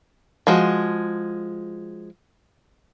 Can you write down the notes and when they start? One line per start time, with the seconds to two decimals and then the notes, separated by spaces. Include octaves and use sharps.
0.47 F3 G#3 F#4